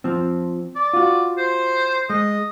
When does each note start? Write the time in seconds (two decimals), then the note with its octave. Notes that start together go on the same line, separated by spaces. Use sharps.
0.04 F3 C4
0.75 D5
0.93 F4 F#4
1.38 C5
2.10 G#3 D#5